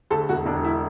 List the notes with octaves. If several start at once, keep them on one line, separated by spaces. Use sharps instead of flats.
D2 A4
E1 F#4
E1 D4
E4